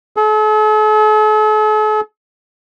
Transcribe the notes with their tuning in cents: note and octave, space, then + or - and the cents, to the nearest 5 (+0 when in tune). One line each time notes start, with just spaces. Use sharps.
A4 -45